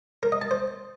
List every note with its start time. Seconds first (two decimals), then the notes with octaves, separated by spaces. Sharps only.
0.23 A#4
0.32 D#5
0.42 A5
0.51 C5